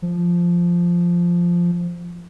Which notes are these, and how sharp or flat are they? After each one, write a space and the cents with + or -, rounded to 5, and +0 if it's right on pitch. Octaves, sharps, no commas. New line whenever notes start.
F3 -5